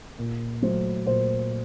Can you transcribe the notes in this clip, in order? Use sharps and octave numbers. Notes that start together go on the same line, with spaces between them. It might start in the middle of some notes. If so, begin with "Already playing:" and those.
A#2
F#3 A3 C5
A#2 C5